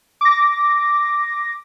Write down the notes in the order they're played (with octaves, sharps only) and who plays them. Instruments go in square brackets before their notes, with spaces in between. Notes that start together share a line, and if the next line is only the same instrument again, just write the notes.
[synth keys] D6 A#6